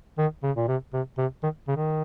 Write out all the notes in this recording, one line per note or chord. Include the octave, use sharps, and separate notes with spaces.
D#3
C#3
A#2
C3
C3
C3
D#3
C#3
D#3